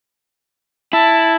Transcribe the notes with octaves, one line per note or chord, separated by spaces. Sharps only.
E4 A5